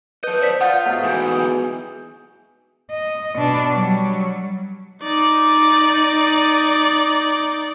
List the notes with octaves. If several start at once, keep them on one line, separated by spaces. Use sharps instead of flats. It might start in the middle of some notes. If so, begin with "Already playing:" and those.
A4 B4 D#5 G6
C5 D5 B6
F4 F#5 D#6 G6 A6
G#2 B2 A3
G#2 E3 G#4 G5
D#5
B2 D4
F#3 G3
D#4 D5